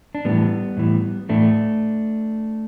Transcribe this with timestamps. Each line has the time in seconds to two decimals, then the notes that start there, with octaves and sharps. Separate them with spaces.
0.15 D4
0.25 A2 E3 G3 B3
0.77 A2 E3
1.29 A2 E3 A3 D4